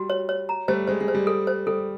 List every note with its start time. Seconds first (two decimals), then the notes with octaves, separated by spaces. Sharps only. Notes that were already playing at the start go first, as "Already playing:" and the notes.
Already playing: G3 F#4
0.10 C#5
0.29 C#5
0.49 A#5
0.68 G3 A3 C5
0.87 G#3 C5
1.01 G#3
1.08 C5
1.15 G3
1.27 A4
1.47 C5
1.67 G3 A4